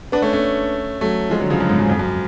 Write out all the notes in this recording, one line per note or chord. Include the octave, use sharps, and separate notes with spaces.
B3 D4
A3 C#4
A3 C#4
F#3 A3
F3 G#3
D3 F#3
C#3 F3
F#2
G#2
F#2
F2
F#2